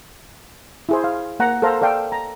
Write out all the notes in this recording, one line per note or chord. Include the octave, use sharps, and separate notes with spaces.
E4 G#4 C5
F5
A#3 F#5 A#5
A4 A#4 C5 F5 A#5
A4 D5 F5 G5
A#5